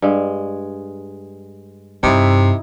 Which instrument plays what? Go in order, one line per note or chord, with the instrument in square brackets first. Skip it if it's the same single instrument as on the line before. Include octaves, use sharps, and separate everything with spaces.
[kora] G2 G#3
[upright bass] G2 [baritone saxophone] C3 [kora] D#4 E4